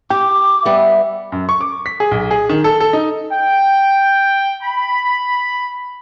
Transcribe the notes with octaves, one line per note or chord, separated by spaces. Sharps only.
G4 G5 D6
G3 B3 E5
F#2
C#6
D6
B6
G#4
B1
G#4
D#3
A4
A4
D#4
G5
B5